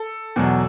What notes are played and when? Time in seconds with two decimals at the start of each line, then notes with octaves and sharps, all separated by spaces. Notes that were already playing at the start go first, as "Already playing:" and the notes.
Already playing: A4
0.36 E2 B2 F#3